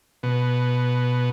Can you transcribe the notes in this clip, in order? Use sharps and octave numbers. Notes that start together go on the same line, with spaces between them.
B2